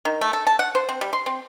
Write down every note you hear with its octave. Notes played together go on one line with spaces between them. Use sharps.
D#3
A3
A4
A5
F#5
C5
C4
G3
C6
C4